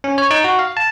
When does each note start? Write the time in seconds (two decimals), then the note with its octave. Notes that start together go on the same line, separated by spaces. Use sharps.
0.04 C#4
0.18 C#5
0.31 D#4
0.44 F#4
0.59 F5
0.77 A5